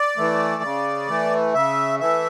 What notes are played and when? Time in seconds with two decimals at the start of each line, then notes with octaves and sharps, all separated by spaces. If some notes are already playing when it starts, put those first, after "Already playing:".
Already playing: D5
0.17 E3 A3
0.63 C#3
1.08 E3 A3
1.54 C#3 E5
2.00 E3 A3 E5